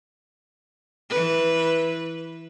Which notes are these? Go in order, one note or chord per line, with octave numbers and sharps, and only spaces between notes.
E3 B4